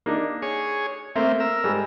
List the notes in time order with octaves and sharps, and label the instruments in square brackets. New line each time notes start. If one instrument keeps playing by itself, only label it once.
[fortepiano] A#3 D4 D#4
[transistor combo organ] G#4 C#5
[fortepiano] A3 [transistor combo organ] A#3 C4
[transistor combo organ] A#4 E6
[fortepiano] G#2 G3